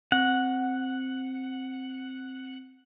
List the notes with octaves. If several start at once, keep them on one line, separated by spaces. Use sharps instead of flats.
C4 F#5